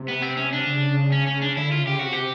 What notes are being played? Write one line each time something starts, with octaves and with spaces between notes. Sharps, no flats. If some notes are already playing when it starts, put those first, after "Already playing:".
Already playing: C3
B3
C4
C#4
D4
C#3
C#4
C#4
D4
D3 E4
F4
C#3
G4
C3 F#4
G4